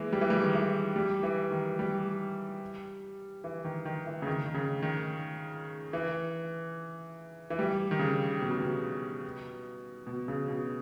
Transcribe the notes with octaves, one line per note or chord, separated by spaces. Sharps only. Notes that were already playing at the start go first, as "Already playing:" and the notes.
Already playing: E3 G#3 A#3
G3
E3
G3
D#3
E3
G3
E3
D#3
G3
E3
D#3
D#3
E3
C#3
D#3
D#3
C#3
D#3
E3
E3
G3
D#3
C#3
B2
C#3
B2
B2
C#3
B2